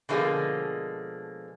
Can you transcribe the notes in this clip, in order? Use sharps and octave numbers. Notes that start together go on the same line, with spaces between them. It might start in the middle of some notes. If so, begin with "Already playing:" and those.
B2 D3 F3 F#3 G#3 A#3